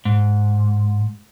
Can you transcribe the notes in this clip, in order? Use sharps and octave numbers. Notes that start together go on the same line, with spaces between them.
G#2